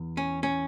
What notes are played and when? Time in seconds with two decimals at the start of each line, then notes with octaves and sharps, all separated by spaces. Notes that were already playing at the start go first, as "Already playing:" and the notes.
Already playing: E2
0.17 C#4
0.43 C#4